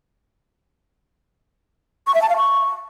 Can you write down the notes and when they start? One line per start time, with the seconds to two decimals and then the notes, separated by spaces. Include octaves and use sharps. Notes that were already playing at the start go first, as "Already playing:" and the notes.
2.07 C#6
2.15 E5
2.22 A5
2.29 F5
2.37 C#6